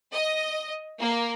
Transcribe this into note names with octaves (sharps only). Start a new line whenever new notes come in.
D#5
A#3